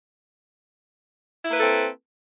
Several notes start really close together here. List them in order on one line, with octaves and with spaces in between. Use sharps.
E4 A#3 B4 A4 C4